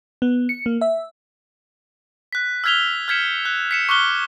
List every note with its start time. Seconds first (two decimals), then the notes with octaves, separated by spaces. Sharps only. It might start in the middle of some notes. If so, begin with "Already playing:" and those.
0.22 B3
0.49 C#7
0.66 A#3
0.81 E5
2.33 F#6 B6
2.64 E6 F6 G#6 B6 F7 G7
3.08 F6 G6 G#6 B6 C#7 E7
3.45 F#6
3.71 B6 C#7 E7
3.89 C#6 D6 F6 F#6 G7